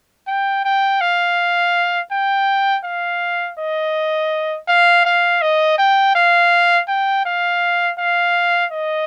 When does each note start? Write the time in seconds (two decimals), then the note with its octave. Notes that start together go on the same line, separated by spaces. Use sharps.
0.28 G5
0.65 G5
1.01 F5
2.12 G5
2.84 F5
3.59 D#5
4.68 F5
5.06 F5
5.42 D#5
5.78 G5
6.15 F5
6.88 G5
7.25 F5
7.99 F5
8.72 D#5